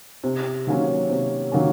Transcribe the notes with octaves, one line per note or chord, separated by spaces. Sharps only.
C3
D#3 F#3 A#3 C#4
C3
D#3 F#3 A#3 C#4